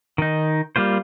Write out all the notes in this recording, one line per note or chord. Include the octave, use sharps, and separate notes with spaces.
D#3 D#4
G3 A#3 F4 C5